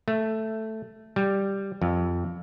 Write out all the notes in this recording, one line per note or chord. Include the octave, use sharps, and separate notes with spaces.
A3
G3
F2